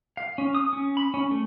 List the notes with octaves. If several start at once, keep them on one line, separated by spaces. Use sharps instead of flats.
F5
C#4
D#6
C#4
B5
C#4
A3